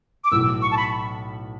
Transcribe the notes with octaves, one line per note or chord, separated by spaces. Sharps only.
D6
B1 A2 E3 A3 E4 E6
C#6
A5
B5